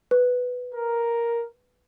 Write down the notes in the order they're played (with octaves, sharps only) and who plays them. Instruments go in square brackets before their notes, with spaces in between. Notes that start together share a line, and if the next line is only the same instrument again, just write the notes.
[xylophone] B4
[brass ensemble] A#4